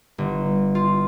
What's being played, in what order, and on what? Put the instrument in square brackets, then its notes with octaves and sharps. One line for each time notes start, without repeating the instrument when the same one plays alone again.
[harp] G1
F4